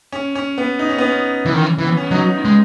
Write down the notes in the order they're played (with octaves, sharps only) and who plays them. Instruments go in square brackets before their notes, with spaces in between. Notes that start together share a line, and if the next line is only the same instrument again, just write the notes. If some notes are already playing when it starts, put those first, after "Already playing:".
[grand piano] C#4
C#4
B3
D#4
C#4
B3
C#4
[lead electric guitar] E3
D#3
E3
E3
[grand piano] B3
C#4
[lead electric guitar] F#3 [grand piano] D#4
[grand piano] D#4
[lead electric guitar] G#3